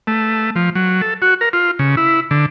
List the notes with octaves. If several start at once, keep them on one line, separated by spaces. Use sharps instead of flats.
A3
F3
F#3
A4
F#4
A#4
F4
C#3
E4
D3